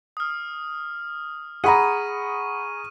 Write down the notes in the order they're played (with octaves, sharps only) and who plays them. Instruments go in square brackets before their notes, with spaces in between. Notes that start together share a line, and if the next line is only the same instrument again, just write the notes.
[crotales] D#6 F6
[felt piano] G#4 A#5 [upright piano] F#5 B5 [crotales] C#6 D#7